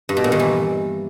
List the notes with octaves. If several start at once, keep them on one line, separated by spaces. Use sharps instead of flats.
G2
B2
A#2
D#3
E3